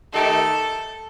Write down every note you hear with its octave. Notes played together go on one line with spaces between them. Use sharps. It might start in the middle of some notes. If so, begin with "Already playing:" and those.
D#3 A3 D#4 G4 A4